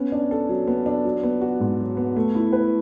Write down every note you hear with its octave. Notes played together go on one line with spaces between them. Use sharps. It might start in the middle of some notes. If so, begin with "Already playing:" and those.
Already playing: B3 C#4
D4
A4
F#3
B3
D4
F#3
B3
F#4
G#2
F#3
B3
A3
E4
B4